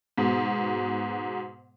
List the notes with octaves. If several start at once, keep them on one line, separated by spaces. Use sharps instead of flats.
G#2 B2